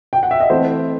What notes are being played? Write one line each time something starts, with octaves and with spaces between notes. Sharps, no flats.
G5
F#5
E5
D#5
E3 A3 C4 E4 C5